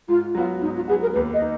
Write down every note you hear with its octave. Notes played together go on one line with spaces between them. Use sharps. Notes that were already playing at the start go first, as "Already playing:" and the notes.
G#2 F4
F#3 B3 F4 F#4
G#2 D#4
F4
F#3 B3 F#4 G#4
A#4
D#2 B4
D#5
D#4